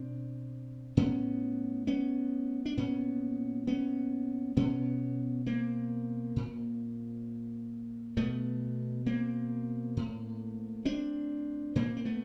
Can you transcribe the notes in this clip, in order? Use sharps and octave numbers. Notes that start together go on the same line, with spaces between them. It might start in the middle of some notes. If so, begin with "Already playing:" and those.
Already playing: B2 C4 D4
A2 B3 C#4
B3 C#4
D4
A#2 B3 C#4
B3 C#4
B2 B3 C#4
A#3 C4
A#2
B2 A3 B3
A#3 C4
A2
C4 D4
A#2 A#3 C4
C4
A3 B3